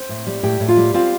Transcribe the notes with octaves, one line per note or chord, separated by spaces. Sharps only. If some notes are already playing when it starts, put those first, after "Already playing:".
Already playing: C4 C5
A2
G3
A2 G4 G5
A2
F4 F5
G3
C4 F4 F5